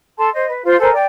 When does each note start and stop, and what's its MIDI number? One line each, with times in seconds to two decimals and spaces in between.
0.17 0.29 69
0.17 0.29 81
0.17 0.29 84
0.33 0.48 72
0.33 0.48 75
0.49 0.63 71
0.64 0.77 65
0.64 0.77 72
0.64 0.77 77
0.79 0.92 69
0.79 0.92 70
0.79 0.92 72
0.79 0.92 80
0.93 1.05 74
0.93 1.05 79